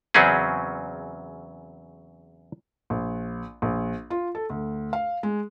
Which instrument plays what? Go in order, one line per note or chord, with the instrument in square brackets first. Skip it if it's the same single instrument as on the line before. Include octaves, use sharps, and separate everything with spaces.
[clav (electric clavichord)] E2 C#3 F#3 C4 C#4 G#4
[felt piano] A#1
A#1
F4
A4
D2
F5
G#3